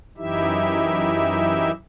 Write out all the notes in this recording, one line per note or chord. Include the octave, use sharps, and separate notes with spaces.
F#2 E3 D#4 E4 G4 E5